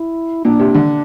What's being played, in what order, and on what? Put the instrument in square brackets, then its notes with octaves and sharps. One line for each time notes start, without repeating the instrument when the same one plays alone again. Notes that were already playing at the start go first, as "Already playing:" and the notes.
Already playing: [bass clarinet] E4
[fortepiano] A#2 [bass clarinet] D4
[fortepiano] C3
D3